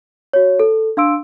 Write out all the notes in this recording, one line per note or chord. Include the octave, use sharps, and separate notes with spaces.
F#4 C#5
A4
D4 F5 C6 E6 D7